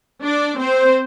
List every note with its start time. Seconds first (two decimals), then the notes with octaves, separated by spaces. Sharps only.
0.23 D4 D5
0.59 C4 C5